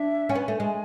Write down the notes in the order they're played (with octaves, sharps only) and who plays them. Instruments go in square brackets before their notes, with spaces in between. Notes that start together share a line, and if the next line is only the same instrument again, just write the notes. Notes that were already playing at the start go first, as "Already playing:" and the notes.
Already playing: [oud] D4 [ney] E5
[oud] C#4
[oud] B3 [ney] G#5
[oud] A3
G#3